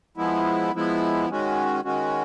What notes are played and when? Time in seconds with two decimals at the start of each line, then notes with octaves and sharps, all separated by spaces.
0.17 F3 G#3 B3 E4
0.74 F3 G#3 B3 E4
1.29 D#3 G#3 C#4 F#4
1.84 D#3 G#3 C#4 F#4